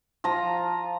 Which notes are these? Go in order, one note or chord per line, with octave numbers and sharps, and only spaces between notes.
F3 A#5